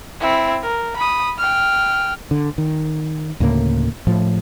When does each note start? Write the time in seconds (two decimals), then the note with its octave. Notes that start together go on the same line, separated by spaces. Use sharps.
0.20 C4 E4
0.62 A#4
0.96 B5 D#6
1.38 G5 F6
2.31 D3
2.58 D#3
3.40 D2 A2 C#3 A#3
4.07 A2 F3